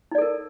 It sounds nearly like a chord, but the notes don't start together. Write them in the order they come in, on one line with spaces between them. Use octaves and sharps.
D#4 D5 A4 A#4